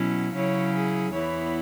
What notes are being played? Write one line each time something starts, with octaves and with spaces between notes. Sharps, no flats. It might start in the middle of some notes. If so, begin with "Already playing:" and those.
Already playing: B2 F#3 C#4 E4
C#3 F#3 C#4 E4 C#5
G#4
E2 E3 B3 E4 C#5